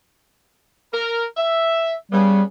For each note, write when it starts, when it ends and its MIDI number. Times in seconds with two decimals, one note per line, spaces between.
0.93 1.24 70
1.37 1.93 76
2.12 2.42 49
2.12 2.43 55
2.12 2.42 59